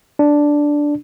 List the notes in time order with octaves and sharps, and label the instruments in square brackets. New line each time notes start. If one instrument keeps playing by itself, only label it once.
[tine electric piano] D4